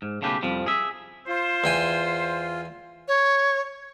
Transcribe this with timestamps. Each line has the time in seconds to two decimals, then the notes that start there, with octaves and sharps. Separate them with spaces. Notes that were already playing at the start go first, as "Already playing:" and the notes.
0.02 G#2
0.22 B1 C#3 A3 G4 B4
0.42 C2 F2 F3 G3
0.66 G#4 E5
1.28 F4 C5
1.64 E2 G5 G#5
3.08 C#5